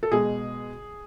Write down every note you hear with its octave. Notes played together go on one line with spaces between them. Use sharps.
A4
B2 G#3 G#4